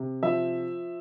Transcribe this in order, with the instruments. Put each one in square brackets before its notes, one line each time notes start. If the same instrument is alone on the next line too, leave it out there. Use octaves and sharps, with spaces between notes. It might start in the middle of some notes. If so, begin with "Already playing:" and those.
Already playing: [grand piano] C3
F3 E5